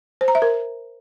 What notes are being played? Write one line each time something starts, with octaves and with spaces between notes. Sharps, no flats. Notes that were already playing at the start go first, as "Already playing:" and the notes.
C5
A#5
E5
A#4